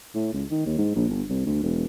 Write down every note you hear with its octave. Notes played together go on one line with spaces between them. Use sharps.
A2
C#2
D#3
D#2
G#2
A#1
G1
C2
D2
E1